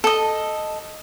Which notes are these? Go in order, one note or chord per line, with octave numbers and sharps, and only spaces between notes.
A4 D#5